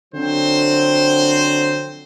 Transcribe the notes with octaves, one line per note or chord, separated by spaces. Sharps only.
D3 F3 F#3 C4 C5